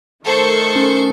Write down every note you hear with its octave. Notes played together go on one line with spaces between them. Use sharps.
D#3 A3 A4 C5 C#6
C#4